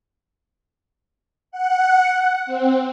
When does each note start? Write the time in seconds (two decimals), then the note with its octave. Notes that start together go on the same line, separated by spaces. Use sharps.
1.51 F#5
2.46 C4